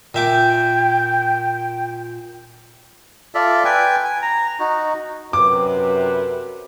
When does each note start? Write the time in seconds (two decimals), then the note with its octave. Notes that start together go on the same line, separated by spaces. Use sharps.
0.15 A#2 E5 G5 D6
3.35 F4 A4 D5 E5
3.65 B4 G5 G#5
4.05 G#5
4.22 A#5
4.60 D#4 F#4
5.33 F#2 C3 B4 D6